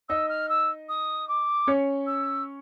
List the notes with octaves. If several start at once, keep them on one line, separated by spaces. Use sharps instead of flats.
D#4 D#5 E6
F6
E6
D#6
D6
C#4 C#5
E6